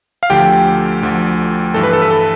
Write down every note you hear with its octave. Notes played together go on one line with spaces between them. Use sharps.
F5
D2 D3 F3 G4 G5
D2 D3 F3
G2 E3 A4
B4
A4
B4
A4